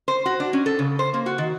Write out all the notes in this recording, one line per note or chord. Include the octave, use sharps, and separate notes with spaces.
C5
F#4
D4
C#4
A4
C#3
C5
A#3
F#4
D#3